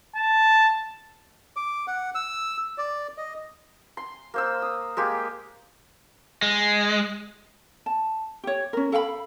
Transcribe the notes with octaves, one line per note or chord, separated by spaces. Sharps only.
A5
D6
F#5
E6
D5
D#5
C6
A#3 C5 E6
D#6
G#3 A#3 G4
G#3
A5
G4 C#5
C#4 A#4
A4 F5 G5 B5